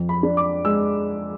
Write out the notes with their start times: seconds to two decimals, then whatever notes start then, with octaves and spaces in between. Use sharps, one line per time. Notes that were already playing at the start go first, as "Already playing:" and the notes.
Already playing: F2
0.09 B5
0.23 D4
0.37 D6
0.65 G#3 E6